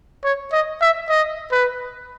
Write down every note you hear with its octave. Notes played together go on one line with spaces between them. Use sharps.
C#5
D#5
E5
D#5
B4